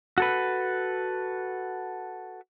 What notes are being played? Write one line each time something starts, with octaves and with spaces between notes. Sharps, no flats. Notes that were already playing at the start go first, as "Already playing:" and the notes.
F#4 A4 B4